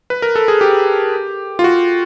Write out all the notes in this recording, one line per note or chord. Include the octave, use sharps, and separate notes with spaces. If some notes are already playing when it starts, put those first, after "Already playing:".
B4
A#4
A4
G#4
G4
F4
F#4